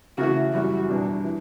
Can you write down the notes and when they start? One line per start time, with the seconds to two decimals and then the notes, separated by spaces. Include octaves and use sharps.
0.18 C#3 E3 A3 F#4
0.53 F#2 E3 G3 F#4
0.89 E2 B2 G3 D4
1.24 E3